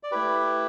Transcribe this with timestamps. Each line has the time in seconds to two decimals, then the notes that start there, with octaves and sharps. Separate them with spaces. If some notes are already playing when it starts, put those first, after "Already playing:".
0.03 D5
0.11 A3 E4 G4 B4